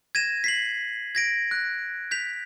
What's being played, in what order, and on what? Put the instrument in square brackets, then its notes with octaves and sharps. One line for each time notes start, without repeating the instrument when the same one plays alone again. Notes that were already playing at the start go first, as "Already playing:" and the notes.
[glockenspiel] G#6 A#6 D#7 E7
B6 C7 F#7
G#6 A#6 D7
F#6
G6 B6 F7